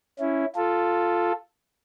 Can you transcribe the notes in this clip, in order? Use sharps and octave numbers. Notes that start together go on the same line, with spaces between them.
C#4 E4
F4 A4